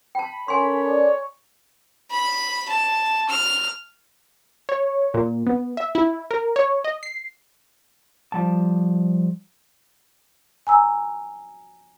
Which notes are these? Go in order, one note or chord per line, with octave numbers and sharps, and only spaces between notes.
G5 A5 B5
C#4 A4 A#4 C#5 G#5 C6
D5
B5
A5
F6
C#5
A#2
B3
E5
E4
A#4
C#5
D#5
C7
F3 G3 A5
G#5 A#5 E6